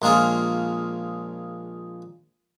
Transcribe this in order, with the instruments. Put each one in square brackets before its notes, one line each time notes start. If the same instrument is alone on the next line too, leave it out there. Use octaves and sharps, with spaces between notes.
[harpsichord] A#1 G#3 A#3 F4 G#4